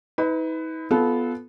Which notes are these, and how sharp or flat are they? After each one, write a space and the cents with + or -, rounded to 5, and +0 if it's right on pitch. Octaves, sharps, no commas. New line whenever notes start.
D#4 +45 B4 +20
B3 +0 F4 +0 A4 -25